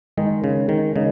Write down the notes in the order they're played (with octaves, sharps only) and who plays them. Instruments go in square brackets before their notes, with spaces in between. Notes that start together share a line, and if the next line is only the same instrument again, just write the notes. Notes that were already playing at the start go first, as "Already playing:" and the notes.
[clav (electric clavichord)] D#3 [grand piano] G#3 D#4 A#4 D#5
[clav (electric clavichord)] C#3
D#3
[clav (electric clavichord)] C#3 [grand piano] G#3 D#4 A#4 D#5